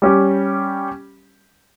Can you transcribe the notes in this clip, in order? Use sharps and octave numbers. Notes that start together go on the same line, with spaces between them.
G3 C#4 G4